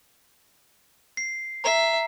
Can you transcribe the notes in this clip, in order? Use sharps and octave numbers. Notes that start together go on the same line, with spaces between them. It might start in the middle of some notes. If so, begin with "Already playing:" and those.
C7
E5 A#5 C7